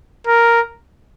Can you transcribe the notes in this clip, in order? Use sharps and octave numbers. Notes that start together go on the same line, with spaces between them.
A#4